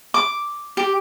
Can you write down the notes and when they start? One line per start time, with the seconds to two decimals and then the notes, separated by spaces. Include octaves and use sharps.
0.14 D6
0.77 G4